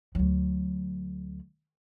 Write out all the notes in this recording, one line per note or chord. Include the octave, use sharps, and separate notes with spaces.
D2 F#3